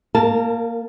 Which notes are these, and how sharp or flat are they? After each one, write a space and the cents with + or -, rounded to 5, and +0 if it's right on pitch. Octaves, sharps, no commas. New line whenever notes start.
A#3 +0 A#4 -30 A5 +0